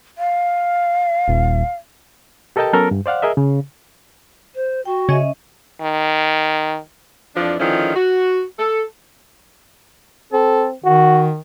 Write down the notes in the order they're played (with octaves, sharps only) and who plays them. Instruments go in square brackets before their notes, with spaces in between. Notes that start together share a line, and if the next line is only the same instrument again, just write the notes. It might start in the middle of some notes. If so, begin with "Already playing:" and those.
[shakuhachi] F5
[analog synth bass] D#1
[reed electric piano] G4 A4 A#4 D#5 G5 A5
F#3 B3 C#4 A4 A#4
G2
C5 D5 F5 F#5
G#4 A#4 D#5 E5
C#3
[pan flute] C5
[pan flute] F#4 [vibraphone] G5
[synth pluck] C#3 [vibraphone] C#4 D#5 E5
[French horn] D#3
[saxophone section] F2 E3 F3 D4
D3 D#3 F3 G#3 C#4 E4
F#4
A4
[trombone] C4 [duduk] A4
[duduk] D#3 [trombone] F#4